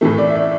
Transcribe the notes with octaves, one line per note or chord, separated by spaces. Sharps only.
A2 E3 A3
D5
E5
D5